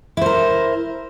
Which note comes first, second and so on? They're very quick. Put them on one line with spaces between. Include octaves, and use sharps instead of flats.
E4 C5 A#4